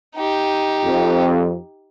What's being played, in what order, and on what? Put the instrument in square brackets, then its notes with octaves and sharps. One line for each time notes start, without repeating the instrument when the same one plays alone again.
[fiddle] D#4 G4
[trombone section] F2